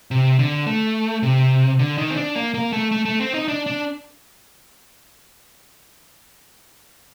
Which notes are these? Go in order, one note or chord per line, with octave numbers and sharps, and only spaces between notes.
C3
D3
A3
C3
D3
D#3
C4
D4
A#3
A#3
A3
A3
A3
C4
D#4
D4
D4